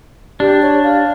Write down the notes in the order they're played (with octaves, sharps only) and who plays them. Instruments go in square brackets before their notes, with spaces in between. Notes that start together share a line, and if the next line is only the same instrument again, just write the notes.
[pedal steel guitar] D4 [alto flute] G4
[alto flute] C#5
F5